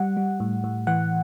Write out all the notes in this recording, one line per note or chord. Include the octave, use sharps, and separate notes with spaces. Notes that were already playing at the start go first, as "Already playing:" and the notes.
Already playing: G3 F#5
G3
A2
A2
E3 F#5